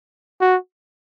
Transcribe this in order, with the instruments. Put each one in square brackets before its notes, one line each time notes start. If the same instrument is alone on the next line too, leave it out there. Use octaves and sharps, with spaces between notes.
[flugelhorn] F#4